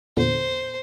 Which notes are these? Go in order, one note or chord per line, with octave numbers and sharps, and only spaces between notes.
E2 A#2 D3 C5